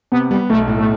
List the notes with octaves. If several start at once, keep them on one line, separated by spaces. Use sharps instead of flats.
C3 B3
G3 B3
B1 A3
A2
A3